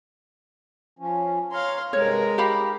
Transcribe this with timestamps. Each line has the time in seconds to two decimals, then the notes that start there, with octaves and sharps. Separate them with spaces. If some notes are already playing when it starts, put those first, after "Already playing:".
0.99 F3 C#4
1.52 C#5 F5 A#5 C6
1.93 G2 C3 G#3 A#4 C#5
2.38 D#4 G4 F5 B5